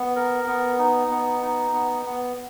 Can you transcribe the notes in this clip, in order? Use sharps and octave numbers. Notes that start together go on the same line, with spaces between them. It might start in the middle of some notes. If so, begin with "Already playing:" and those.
Already playing: B3
A#4
B3
D#4
B3
D#4
B3
B3